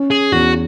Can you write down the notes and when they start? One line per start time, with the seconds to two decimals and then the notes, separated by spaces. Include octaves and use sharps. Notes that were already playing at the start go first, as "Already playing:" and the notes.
Already playing: C#4
0.11 G#4
0.32 E2 F#4